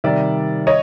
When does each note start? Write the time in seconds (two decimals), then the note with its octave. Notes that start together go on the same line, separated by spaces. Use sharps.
0.04 C3 D#3 G3 D5 E5
0.67 C#5 D#5